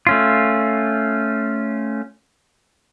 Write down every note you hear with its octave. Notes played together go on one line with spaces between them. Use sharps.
A3 C#4 F4